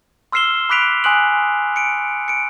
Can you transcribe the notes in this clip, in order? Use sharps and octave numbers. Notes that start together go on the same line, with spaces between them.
C6 E6 F6 C7 E7 G7
B5 D6 F#6 B6 D7 F7
G#5 C6 D#6 F#6 D7 F#7
C#7 D7
C#7 D7